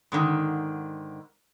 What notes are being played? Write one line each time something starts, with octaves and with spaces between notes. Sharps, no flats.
G#2 D3 D#3